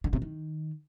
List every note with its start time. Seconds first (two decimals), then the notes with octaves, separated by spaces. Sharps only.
0.04 D3
0.13 C3
0.22 D#3